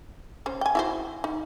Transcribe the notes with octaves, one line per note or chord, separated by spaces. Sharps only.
C#4 C5
G5 G#5
E4 F#4 C5
D#4